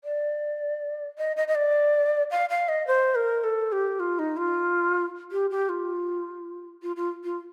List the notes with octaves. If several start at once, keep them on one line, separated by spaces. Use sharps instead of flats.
D5
D#5
D#5
D#5
D5
F5
F5
D#5
C5
A#4
A4
G4
F4
D#4
F4
G4
G4
F4
F4
F4
F4